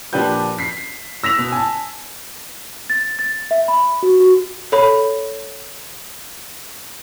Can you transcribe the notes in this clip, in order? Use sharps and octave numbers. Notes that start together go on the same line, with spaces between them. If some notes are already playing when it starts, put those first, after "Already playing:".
A#2 F3 D4 G4 B4 G6
B6 C7
E6 A#6 B6 F7
B2
G#5 A5
A6
A6
E5
B5
F#4
F#4
A4 C#5 B5